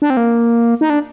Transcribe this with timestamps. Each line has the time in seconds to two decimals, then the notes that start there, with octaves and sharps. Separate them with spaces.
0.02 D4
0.10 C4
0.17 A#3
0.81 D#4
0.90 D4